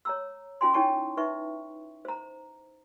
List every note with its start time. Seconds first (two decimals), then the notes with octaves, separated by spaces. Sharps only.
0.05 C#5 A#5 E6
0.61 C#4 F4 G#5 C6
0.74 D#4 E4 C#5 G5 A5 C#6
1.17 D#4 B4 E5 C#6
2.05 C5 A#5